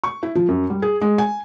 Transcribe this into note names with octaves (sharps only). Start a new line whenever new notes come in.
C#6
E4
F3
F#2
G3
G#4
G#3
G#5